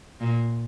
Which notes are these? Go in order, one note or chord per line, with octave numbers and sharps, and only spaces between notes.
A#2